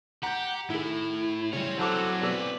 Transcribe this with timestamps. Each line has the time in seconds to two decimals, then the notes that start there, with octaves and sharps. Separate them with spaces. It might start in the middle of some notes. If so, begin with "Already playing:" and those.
0.23 G4 F#5 A#5 G6
0.70 A2 D#3 E4 G#4
1.53 C#3 E3 G3 C4 C#4 C#5
1.79 F#3 E4 A4 C5 F#5 D6
2.22 B2 G#4 B4 D5 E6